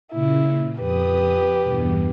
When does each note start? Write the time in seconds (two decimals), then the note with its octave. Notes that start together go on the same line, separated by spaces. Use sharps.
0.12 A#2 C#3 E4
0.78 F2 G4 B4 D#6
1.63 E2 G2 B2